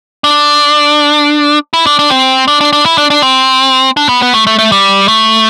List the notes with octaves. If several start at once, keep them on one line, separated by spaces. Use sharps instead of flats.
D4
E4
D4
D4
C4
D4
D4
D4
E4
D4
D4
C4
D4
B3
B3
A3
A3
A3
G3
A3